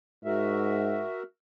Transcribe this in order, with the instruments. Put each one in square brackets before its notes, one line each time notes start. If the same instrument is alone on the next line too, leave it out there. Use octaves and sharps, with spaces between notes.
[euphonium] G#2 [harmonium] F#4 A#4 E5